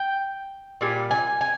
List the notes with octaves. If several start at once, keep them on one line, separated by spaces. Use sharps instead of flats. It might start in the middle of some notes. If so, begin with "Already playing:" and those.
Already playing: G5
A#2 G3 G#5
G#5
G#5